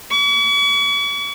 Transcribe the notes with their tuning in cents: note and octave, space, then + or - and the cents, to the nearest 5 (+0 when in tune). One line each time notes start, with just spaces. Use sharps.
C#6 +45